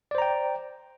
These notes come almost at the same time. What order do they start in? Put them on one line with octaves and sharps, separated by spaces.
D5 C5 A#5 G5